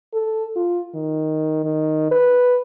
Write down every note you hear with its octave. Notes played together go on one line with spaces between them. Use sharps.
A4
F4
D#3
D#3
B4